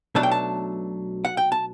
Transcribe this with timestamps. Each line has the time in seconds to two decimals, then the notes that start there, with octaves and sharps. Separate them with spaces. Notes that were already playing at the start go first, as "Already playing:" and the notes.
0.15 B1 B2 F#3 A3 D4 A5
0.23 G5
0.31 A5
1.25 F#5
1.37 G5
1.52 A5